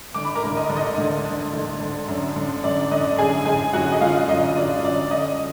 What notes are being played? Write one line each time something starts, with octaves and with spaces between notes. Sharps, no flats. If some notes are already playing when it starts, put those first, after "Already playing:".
D3 D6
B5
A#4 A#5
D2
D#5
D3
D#5
D2
D3
D2
D3
F#2
D3
F#2 D5
D3 D#5
F#2 G#4 G#5
D3 G#4 G#5
F#2 F#4 F#5
D#5
D3 F4 F5
F#2 D#5
D3 D5
F#2 D5
D3 D#5